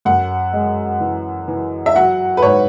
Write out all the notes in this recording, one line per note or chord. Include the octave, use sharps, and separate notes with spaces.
F#2 F#5
G#3
E3
E3
E5
F#3 F#5
B4
G#2 C#5